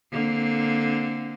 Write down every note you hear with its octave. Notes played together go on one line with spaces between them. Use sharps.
D3 A#3 C4